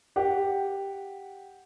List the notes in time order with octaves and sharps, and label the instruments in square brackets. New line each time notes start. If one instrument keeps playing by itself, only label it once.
[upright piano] G4 F#5